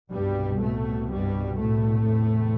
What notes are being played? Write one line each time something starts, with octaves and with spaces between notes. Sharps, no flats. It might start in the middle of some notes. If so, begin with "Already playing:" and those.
C2 G2 B2 G3
A2 A3
G2 G3
A2 A3
E2 C3